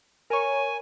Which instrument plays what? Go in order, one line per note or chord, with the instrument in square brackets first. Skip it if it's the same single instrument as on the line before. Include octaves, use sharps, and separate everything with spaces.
[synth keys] A#4 C#5 [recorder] G#5